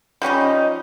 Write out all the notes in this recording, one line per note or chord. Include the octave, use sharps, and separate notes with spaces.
F3 G3 C#4 D#4